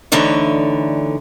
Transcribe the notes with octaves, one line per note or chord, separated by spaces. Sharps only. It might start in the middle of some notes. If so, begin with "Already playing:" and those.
D2 D3 E3 D#4 C#5